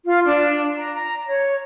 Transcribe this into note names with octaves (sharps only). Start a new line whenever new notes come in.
F4
D4
A#5
A#5
C#5